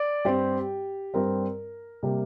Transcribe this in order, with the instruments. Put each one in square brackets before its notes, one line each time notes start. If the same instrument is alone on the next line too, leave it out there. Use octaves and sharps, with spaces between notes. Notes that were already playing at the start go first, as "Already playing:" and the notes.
Already playing: [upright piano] D5
G2 G3 C4 G4
G2 G3 C4 A#4
C3 G3 A#3